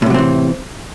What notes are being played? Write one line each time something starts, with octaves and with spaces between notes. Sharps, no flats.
A2 C3 E3 F#3 C4